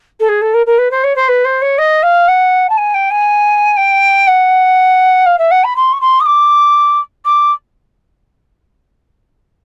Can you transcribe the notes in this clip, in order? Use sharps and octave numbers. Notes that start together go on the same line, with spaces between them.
A4
G#4
A4
A#4
A#4
B4
C5
C#5
C5
B4
C5
C#5
D#5
F5
F#5
A5
G#5
G5
G#5
G5
F#5
F5
E5
F#5
B5
C6
C#6
C6
D#6
D6
D6